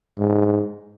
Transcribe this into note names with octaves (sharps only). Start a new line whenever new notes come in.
G#2